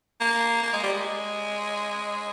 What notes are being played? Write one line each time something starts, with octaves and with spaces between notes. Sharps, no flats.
A#3
A#3
G#3
G3
G#3